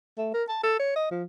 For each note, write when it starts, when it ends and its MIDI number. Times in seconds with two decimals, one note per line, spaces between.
0.18 0.32 57
0.34 0.44 70
0.49 0.61 81
0.63 0.77 69
0.79 0.95 73
0.96 1.10 75
1.11 1.24 53